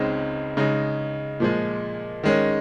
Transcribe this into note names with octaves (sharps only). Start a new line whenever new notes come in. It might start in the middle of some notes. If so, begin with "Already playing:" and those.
Already playing: C#2 C#3 G#3 C4 D#4
C#3 G#3 D#4
A#2 F3 G#3
D#3 G#3 C#4